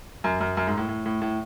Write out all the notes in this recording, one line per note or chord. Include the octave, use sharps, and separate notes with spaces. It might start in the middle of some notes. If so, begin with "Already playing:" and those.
F#2
F#2
F#2
G#2
A2
A2
A2
A2